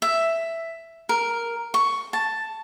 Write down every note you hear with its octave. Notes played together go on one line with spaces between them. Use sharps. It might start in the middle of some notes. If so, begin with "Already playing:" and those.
E5
A#4
C#6
A5